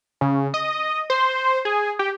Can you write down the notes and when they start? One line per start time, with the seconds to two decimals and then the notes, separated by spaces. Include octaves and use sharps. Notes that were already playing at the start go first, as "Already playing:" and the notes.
0.21 C#3
0.54 D#5
1.10 C5
1.65 G#4
1.99 G4